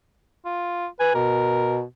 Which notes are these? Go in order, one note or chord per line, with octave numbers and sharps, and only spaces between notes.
F4
B4 G#5
B2 A#4